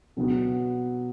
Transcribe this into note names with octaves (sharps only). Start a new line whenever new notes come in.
B2 F#3 B3 F#4